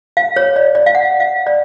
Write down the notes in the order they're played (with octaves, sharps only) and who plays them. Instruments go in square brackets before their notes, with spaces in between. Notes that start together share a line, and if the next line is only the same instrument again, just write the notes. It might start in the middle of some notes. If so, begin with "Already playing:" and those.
[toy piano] F5
C#5
D5
D5
F5
F#5
F5
D5